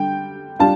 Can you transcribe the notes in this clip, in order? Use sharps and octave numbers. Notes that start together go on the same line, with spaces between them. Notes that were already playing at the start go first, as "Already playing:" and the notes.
Already playing: D3 G3 G5
G3 D4 F4 A5